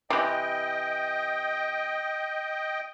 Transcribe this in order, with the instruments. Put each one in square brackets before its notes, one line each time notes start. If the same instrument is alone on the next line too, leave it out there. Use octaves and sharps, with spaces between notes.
[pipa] C3 E3 [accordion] D#5 G5